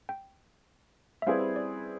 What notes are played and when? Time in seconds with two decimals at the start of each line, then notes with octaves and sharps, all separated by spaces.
0.09 G5
1.22 E5
1.26 G3 C4 E4 G#4 B4 F5
1.56 D5